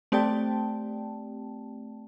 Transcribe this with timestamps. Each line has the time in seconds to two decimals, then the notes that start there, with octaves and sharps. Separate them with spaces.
0.12 A3 C4 G4 D5 G5 A5